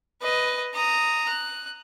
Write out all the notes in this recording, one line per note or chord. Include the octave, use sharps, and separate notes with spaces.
B4 D#5
A#5 D#6
F#6